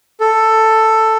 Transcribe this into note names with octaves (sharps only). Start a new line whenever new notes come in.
A4